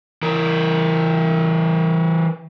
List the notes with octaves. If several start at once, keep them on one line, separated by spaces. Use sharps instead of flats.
E3 A#4